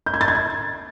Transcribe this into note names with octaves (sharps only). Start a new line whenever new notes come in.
G6
G#6
A6
G#6
A6